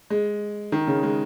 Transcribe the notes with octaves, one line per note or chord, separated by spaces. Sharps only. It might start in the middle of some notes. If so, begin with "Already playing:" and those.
G#3
D#3
C#3
G#3